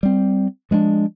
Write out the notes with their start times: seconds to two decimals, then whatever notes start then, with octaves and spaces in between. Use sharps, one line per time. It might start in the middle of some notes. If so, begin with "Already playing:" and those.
0.03 G3 C4
0.71 F3 G#3 A3 D4